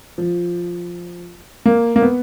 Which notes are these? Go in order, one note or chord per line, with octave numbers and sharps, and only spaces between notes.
F3
A#3
A#3
B3